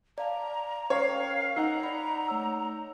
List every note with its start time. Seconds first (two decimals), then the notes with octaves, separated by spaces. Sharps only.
0.18 D5 F5 A5 A#5
0.90 C#4 A#4 C#5 F5 G5
1.56 D#4 F#5 A#5 E6
1.83 D5 B5
2.28 A3 C#5 E6